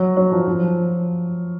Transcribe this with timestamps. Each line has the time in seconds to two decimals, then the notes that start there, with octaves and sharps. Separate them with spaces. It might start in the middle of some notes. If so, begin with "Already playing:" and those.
Already playing: F#3
0.17 F#3
0.32 F3
0.47 F3